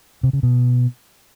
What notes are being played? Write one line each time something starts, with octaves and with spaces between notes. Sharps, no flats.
C3
C#3
B2